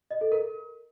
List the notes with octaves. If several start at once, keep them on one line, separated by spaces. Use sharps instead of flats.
D#5
A4
A#4